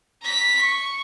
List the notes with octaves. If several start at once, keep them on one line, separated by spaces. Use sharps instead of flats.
A#5 B6
C#6